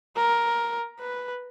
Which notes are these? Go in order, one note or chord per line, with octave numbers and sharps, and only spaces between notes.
A#4
B4